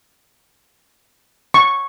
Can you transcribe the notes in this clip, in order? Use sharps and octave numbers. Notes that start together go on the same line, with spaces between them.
C#6